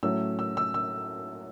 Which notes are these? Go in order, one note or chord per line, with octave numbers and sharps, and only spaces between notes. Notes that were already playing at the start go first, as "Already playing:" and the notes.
A2 F#3 A3 C#4 E6
E6
E6
E6